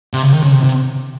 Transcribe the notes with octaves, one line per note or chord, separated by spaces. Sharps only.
C3
C#3
D#3
C#3
C3
C3